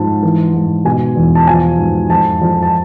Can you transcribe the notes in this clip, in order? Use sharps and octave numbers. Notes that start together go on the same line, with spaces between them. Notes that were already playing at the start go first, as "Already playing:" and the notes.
Already playing: G#2 F3 A5
E3
G#2
B2 G#5
E2
A5
F3 G#5
G#2
F2 A5
F2
A5